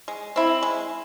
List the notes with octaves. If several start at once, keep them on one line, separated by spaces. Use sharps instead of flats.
G#3
C4 E4
G#3